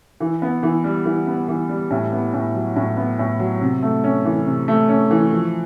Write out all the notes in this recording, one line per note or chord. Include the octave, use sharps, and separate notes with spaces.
E3
B3
E3
G3
E3
B3
E3
G3
A2
B3
A2
F#3
A2
B3
A2
F#3
C3
A3
C#4
E3
C3
A3
C#4
E3
F3